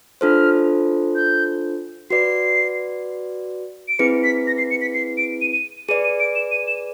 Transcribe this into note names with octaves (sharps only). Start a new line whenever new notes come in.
D4 F4 A4 C5 F6
G6
F#4 B4 D5 C7
D7
C4 E4 G#4 B4 C#7
B6
A#6
C7
C#7
B6
C7
D7
D#7
D#7
G#4 B4 D5 D#7
D#7
D7
E7
D#7
E7